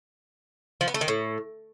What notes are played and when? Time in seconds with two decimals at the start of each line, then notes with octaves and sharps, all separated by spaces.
0.81 F3
0.88 B3
0.94 A3
1.01 D#3
1.08 A2